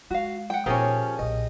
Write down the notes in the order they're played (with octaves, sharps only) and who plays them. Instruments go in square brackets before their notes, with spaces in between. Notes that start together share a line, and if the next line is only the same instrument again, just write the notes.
[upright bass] G#3 [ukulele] F#4 F5
[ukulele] F#5 G5
[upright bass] A#2 D#4 [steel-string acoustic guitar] F3 C#4 [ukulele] G4 G#4 A#4
[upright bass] B1 A#2 [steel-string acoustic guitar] D#5